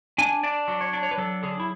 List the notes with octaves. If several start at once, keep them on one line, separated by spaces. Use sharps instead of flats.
D4 G#5
D4 D5
F#3
C#5
D4
C#5
B4
F#3 A4
D3 G#4
E4